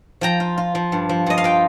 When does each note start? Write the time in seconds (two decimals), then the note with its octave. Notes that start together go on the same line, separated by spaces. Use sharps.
0.21 F3 G5 A#5
0.40 F4
0.58 F4
0.75 F3
0.92 G2
1.09 F3
1.26 G2 D#5
1.38 F5
1.44 F4 G5